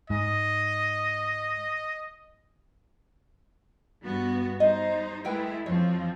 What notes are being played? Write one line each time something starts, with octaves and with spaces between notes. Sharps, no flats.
G#2 D#5
G2 B3 F#4
G3 D#4 C5 D#5
G#3 A3 E4 A#4 B4 G5
F2 F3 C4 C#5